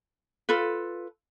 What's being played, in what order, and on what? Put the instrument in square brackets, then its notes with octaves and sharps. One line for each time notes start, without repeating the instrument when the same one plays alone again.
[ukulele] F4 A4 B4